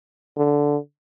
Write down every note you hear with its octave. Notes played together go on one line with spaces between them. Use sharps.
D3